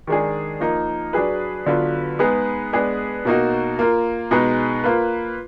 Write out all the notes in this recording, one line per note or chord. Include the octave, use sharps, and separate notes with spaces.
D#3 G#3 D4 G#4
F3 A#3 D#4 A#4
F#3 D4 G#4 B4
D3 F#3 B3 F4 B4
G#3 B3 D#4 G#4 B4
G#3 B3 D4 G#4 B4
B2 A#3 D#4 F#4
A#3 F4 A#4
B2 G#3 D#4 G#4 B4
A#3 F4 B4